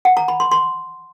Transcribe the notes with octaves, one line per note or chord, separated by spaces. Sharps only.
F#5
A#5
B5
C6
C6